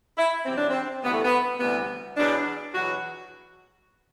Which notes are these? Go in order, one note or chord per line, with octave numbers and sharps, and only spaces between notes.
E4
E2 C3 F#3 C4
D4
C4
D2 C3 E3 G3 B3
A3
B3
D2 C3 E3 G3 B3
E2 B2 F#3 D4
E2 B2 F#3 F#4